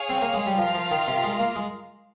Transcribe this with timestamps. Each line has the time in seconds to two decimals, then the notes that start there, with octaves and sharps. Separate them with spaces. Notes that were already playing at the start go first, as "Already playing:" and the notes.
Already playing: G#4 C#5 F5 G#5
0.09 C4
0.22 A#3
0.34 G#3
0.46 G3
0.58 F3 F4 A#4 F5
0.74 F3
0.91 D#3
1.08 C3
1.23 G#3
1.39 A#3
1.56 G#3